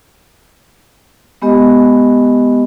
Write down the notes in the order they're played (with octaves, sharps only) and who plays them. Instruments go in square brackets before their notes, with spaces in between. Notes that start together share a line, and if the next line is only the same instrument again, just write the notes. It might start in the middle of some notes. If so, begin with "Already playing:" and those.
[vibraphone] G#3 B3 G4 D#5